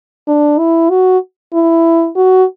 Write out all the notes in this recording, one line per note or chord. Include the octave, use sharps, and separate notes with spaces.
D4
E4
F#4
E4
F#4